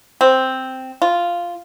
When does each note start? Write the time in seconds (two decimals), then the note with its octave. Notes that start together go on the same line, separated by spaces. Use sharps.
0.21 C4
1.02 F4